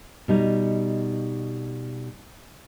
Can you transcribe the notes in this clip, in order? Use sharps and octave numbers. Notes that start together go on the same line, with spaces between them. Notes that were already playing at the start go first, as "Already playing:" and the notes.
B2 G3 D#4